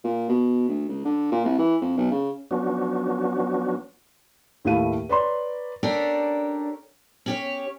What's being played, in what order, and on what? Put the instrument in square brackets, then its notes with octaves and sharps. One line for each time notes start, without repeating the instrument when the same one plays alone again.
[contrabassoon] A#2
B2
D2
C#2
D3
A#2
C2
E3
F2
B1
C#3
[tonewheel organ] F3 F#3 B3 C#4 D4 F#4
[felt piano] D#2 A2 A3 E4 F5 D#7
B4 C#5 D5 A#5 C6
[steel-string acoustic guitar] C#4 D4 G4 A4 A#4 D5
C#4 G4 C#5